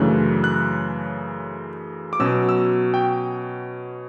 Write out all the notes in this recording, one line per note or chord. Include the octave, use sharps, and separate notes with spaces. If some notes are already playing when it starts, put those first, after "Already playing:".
Already playing: F#2 C#3 E3 A3 D4 F#6
F#6
D6
B2 F#3 C#4 E6
E6
G5